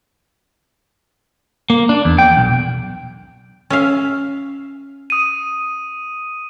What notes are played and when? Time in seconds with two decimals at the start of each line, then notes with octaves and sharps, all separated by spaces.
1.70 A#3
1.89 D4
2.05 E2
2.18 G5
2.37 B1
3.70 C#4 E5 F5
5.10 D#6 D#7